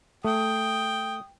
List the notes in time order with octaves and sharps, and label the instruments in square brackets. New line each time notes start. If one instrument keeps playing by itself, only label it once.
[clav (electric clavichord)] A3 [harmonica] G5 [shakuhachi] D#6